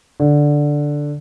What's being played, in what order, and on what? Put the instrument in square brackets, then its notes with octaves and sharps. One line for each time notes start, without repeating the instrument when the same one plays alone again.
[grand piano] D3